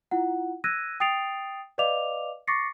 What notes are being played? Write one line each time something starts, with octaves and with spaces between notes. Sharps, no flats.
E4 F4 F#5
E6 F#6 G#6 A#6 D#7
G5 D#6 A6 C7 D7 F7
B4 D5 D#5 F5 D6 F7
C#6 D6 A6 A#6 C7 C#7